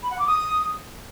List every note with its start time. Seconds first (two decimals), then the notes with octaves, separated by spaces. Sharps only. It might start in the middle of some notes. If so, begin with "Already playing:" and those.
0.02 B5
0.10 F#5
0.18 D6
0.26 D#6